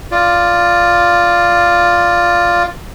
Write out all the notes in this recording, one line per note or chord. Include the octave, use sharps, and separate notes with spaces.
F4 D5